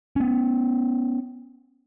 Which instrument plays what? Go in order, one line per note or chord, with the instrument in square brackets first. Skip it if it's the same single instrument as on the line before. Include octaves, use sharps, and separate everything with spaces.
[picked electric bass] B3 C#4